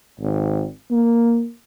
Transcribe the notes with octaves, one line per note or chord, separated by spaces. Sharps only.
G#1
A#3